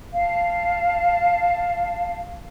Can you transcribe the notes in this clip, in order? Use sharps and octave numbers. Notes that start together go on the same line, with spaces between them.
F5 A5